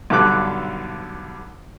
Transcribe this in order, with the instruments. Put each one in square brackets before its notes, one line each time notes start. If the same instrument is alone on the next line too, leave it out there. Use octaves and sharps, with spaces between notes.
[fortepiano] B1 G2 D3 A4 D6 F#6